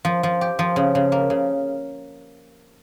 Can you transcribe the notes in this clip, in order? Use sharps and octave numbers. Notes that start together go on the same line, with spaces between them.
F3
F3
G4
F3
C#3
C#3
A#3
C#3